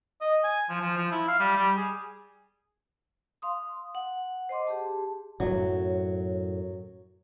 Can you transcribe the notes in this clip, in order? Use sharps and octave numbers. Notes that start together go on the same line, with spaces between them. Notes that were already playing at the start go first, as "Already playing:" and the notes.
D#5
G#5
F3
F3
F3
E4
F5
G3
G3
G#4
F5 C6 D#6
F#5
C5 D#5 C6 D6
G4 G#4 A5
F#2 A2 F#3